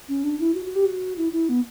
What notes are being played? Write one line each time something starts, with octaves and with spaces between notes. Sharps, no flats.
C#4
D4
E4
F#4
F#4
G4
F#4
E4
E4
B3